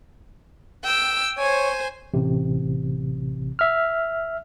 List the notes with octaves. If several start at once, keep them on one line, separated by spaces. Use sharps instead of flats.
G5 E6
C5 C#5 G#5
A1 C3
E5 F6